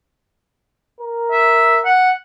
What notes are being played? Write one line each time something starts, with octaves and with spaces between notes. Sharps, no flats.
A#4
E5
F#5